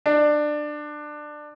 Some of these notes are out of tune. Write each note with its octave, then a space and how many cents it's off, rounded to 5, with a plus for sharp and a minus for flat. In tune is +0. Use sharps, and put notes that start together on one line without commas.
D4 +20